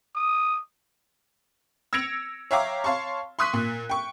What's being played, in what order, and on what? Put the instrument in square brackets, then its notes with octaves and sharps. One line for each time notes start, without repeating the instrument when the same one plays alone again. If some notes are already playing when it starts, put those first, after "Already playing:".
[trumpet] D#6
[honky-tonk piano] E6 G#6 A#6 C#7 D7 F7
C#5 E5 F5 G5 A#5 D6
C#5 F5 A5 C6 C#6
C6 C#6 D#6 F#6 B6 D#7
A#2
G5 C#6